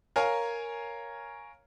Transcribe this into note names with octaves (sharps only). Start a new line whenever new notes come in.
A#4 C#5 F5 G#5 A#5